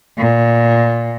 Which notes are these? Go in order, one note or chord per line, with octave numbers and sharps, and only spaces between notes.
A#2